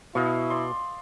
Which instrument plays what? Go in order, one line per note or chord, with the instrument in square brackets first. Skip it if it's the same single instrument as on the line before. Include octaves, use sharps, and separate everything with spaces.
[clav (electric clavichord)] B2 [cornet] E4 [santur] D#5 F5 C#6
[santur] D5 C6